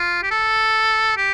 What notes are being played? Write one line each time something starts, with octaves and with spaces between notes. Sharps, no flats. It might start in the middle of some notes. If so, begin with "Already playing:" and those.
Already playing: F4
G4
A4
G4